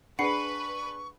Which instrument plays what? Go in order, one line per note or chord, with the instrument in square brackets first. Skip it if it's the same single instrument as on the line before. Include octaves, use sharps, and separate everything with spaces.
[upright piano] D4 G#4 [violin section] B4 [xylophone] F#5 B5 C7 [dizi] C#6